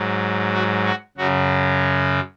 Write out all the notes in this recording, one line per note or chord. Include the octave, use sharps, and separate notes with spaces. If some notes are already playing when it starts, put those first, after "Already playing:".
Already playing: G#2 F#3
F#4
F#4
F#2 C#3 F#3 F#4